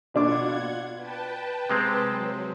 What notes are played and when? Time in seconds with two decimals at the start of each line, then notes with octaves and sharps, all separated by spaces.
0.14 B2 D4 F4 F#5 D6 G#6
0.96 B4 G5 A5
1.69 C3 G#3 C4
2.08 F#3